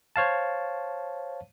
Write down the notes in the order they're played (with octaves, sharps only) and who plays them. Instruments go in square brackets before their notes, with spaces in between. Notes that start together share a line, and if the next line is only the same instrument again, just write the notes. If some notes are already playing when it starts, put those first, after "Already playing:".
[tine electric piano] C5 C#5 F5 A5